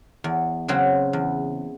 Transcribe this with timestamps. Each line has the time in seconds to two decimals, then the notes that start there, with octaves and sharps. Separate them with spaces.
0.24 E2
0.68 C#3 F#3 C4
1.13 E2